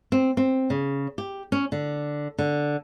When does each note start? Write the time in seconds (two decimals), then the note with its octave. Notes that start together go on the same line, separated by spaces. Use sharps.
0.12 C4
0.37 C4
0.70 C#3
1.18 G4
1.52 C#4
1.72 D3
2.39 D3